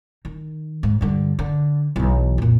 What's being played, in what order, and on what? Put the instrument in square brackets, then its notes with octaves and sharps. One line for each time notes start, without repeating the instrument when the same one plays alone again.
[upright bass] D#3
G#2
G2 D3
D3
B1 E3
F2 A#2